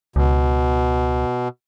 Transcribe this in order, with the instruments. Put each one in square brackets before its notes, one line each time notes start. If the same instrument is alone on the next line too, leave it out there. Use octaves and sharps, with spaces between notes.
[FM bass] C#2 [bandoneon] B2